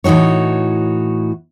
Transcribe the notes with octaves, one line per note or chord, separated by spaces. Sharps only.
A2 E3 D#4 F#4 C#5